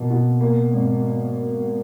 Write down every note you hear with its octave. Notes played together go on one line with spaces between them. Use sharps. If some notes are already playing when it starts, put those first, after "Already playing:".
Already playing: B2 A#3
B2
A#3
G#1